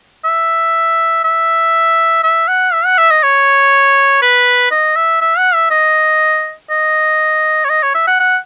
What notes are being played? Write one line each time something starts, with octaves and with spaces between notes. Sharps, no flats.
E5
E5
E5
F#5
E5
F#5
E5
D#5
C#5
B4
D#5
E5
E5
F#5
E5
D#5
D#5
C#5
D#5
C#5
E5
F#5
F#5